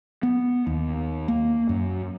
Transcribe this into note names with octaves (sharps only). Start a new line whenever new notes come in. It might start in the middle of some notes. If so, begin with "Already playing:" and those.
B3
D#2
A#3
F#2